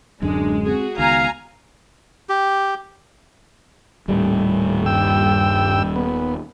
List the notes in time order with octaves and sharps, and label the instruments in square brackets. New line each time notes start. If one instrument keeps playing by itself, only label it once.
[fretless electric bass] D1 F#2 D3 [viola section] G#3 [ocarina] D4
[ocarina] C4 [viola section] F#4 G#4
[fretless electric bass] C#2 D#3 [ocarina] B3 [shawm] F5 [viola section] G#5 A#5
[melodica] G4
[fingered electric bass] D#1 G3 [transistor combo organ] A2
[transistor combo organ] G2 G5 E6
B3